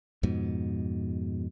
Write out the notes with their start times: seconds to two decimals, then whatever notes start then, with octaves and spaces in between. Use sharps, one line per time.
0.23 F2 G#2 B2